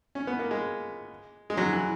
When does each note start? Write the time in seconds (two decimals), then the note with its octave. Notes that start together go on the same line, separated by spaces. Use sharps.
0.15 C#4
0.27 B3
0.39 A#3
0.51 G#3
1.50 G#3
1.57 F#3
1.73 E3